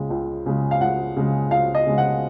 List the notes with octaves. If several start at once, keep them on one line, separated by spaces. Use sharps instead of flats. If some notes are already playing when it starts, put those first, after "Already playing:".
Already playing: C#2 C#3 G#3
C#2
C#3 G#3
F5
C#2 F#5
C#3 G#3
C#2 F5
D#5
C#3 G#3
F#5